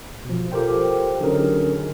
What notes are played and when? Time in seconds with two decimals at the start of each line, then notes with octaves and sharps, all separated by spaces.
0.25 B2 F3
0.52 F4 G4 A4 A#4 C5 G5
1.20 D3 F#3 C#4 D#4 G#4 A#4